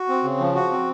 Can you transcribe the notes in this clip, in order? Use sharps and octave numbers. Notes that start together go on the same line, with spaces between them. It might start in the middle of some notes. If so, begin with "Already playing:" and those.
Already playing: F#4
C4
C#3
F3
F#4
C4